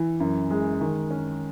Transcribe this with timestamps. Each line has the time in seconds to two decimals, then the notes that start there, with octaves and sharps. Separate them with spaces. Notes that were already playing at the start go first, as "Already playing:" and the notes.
Already playing: E3
0.20 F#2
0.51 G#3
0.81 D#3
1.11 C#4